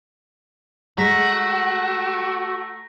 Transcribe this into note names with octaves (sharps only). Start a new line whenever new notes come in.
G#3 A3 F#4 A#5 A#6 B6